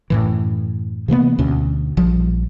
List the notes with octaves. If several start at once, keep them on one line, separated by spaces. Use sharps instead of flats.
F#2 A2 E3
C3 E3 A#3 B3
D2 B2 C#4
A#1 F3 G3